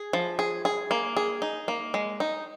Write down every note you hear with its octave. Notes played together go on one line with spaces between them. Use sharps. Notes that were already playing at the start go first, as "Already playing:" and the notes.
Already playing: G#4
F3
G#4
G#4
A#3
G#4
D#4
A#3
G#3
D#4